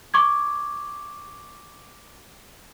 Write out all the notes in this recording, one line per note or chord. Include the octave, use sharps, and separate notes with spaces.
C#6 D6 G#6